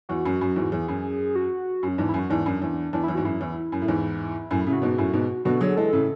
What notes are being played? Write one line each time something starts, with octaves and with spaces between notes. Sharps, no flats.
E2 F#4
F#2
F#2
E2 G#2
E2 G#4
F#2
F#4
F#2
C#4
E2 G#2 D4
F#2 E4
F#4
E2 G#2 D4
F#2
E2
E2 D4
E2 E4
G#2 F#4
F#2 E4
E2
F#2
A2
E2 G#2
F#2 A2 C#4
E4
A2 C#3
F#4
G#2 B2
F#2 A2
G#2 B2
B2 D3 F#4
D3 F#3 G#4
E3 G#3 A4
A2 C#3